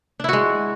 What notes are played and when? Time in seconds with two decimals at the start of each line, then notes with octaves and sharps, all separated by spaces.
0.20 D4
0.24 E4
0.29 F#4
0.33 G#3